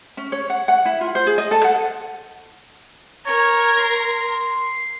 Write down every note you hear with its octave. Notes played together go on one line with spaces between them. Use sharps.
C#4
C#5
F#5
F#5
E4
F4
C5
G#4
D#5
A4
F#5
A#4 C#5
C6